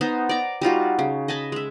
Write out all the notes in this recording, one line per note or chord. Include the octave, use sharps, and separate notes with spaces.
B3 D#4 C5
D5 A#5
G3 D#4 F4 F#4
C#3
D#5 G#5 A5 B5
G#3 E5